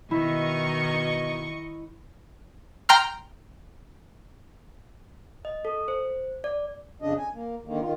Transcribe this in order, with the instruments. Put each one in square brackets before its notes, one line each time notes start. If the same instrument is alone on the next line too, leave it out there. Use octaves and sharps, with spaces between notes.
[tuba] B2 [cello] D#3 [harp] E4 [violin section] D#5 C#6
[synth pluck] G5 A#5 C6 F6
[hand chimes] D#5
A4
C5
D5
[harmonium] F2 C#3 D4 D#5
G#5
A#3
D3 D#3 A#3
D#3 F4